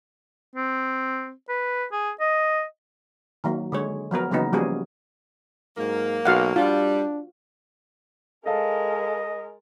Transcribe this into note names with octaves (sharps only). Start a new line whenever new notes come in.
C4
B4
G#4
D#5
D#3 F#3 A#3
D3 G#3 C#5
F3 F#3 B3 A#4
C#3 E3 F#3 A#3 B3 D#4
F3 G3 A#3 C#4 F#4 G#4
G#2 F#3 A#3
B1 F#4 F5 F#5
G3 D4 F4
G#3 A4 A#4 D#5 F5 A5